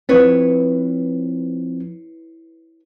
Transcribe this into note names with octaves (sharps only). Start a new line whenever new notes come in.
F3 C4 E4 B4 C#5